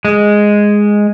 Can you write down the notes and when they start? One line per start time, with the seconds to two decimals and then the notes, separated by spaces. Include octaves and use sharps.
0.05 G#3